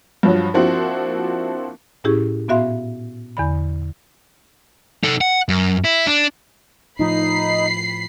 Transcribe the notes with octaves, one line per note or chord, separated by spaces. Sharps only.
G2 F3 F#3
F3 A#3 C4 D4 E4 F#4
A2 C#4 E4 G4 G#4
A#2 B3 F#4 E5 F5 C6
E2 D3 B5
D#4 A4
F#5
F#2
E4
D4
A2 F3 D#4 B5 C7